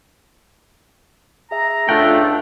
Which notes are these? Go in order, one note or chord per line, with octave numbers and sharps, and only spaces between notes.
G#4 E5 A#5
C#2 A3 D4 F4 F#5 G5